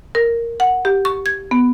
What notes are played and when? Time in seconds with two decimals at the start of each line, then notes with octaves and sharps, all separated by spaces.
0.15 A#4
0.60 F#5
0.85 G4
1.05 C#6
1.26 G#6
1.51 B3